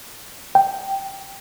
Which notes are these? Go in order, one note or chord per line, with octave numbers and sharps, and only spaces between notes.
G5